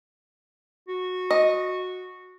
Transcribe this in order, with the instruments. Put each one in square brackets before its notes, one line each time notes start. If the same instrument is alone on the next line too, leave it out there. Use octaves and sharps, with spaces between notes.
[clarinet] F#4
[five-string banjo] D#5